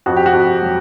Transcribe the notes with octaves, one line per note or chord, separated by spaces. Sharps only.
F2 F#4
G4
F#4
F2
F#3